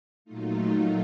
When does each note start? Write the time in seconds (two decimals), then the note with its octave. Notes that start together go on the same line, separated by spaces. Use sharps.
0.25 A#2 F#3 A3 D#4 F4